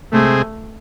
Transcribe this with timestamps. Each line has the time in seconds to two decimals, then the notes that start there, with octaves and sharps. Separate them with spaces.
0.12 C3 G#3 A3 C4 G#4